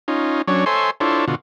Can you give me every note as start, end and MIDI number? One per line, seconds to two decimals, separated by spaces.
0.08 0.42 61
0.08 0.42 63
0.08 0.42 65
0.48 0.64 54
0.48 0.64 61
0.48 0.64 62
0.48 0.64 73
0.66 0.90 69
0.66 0.90 72
0.66 0.90 73
0.66 0.90 76
0.66 0.90 80
0.66 0.90 84
1.00 1.25 62
1.00 1.25 64
1.00 1.25 65
1.00 1.25 69
1.00 1.25 72
1.00 1.25 73
1.28 1.35 47
1.28 1.35 50
1.28 1.35 65
1.28 1.35 66